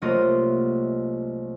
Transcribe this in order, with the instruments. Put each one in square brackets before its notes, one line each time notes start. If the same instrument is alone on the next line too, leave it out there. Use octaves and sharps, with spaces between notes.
[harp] C2 F#3 A3 A#3 F4 D#5